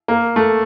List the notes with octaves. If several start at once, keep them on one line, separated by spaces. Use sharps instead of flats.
A#3
A3